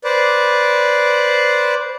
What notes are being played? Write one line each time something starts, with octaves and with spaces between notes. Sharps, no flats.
B4 C5 D5